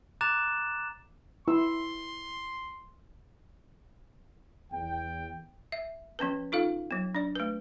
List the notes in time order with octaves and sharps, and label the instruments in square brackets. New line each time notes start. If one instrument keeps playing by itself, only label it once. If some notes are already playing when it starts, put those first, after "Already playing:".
[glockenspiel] A#5 D6 F#6 A6 E7
[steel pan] E4 B4 E6 [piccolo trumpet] C6
[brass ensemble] E2 G5
[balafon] E5
F3 B3 C#4 B4
D#4 F4 A4 F5
F#3 B3
D4 D5
A3 B4